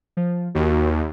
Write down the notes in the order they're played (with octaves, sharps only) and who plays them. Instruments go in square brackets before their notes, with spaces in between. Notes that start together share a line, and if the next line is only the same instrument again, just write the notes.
[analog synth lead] F3
[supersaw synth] D#2 [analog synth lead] F#4